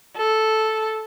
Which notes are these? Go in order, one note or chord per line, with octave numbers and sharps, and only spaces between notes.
A4